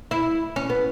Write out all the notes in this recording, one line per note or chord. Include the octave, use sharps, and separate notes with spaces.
E4
C#4
B3